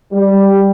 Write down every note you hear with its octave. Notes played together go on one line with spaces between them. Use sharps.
G3